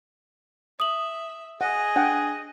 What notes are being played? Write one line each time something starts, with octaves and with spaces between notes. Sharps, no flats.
E5 D#6 F#7
G#4 D#5 F#5
D4 F#5 G5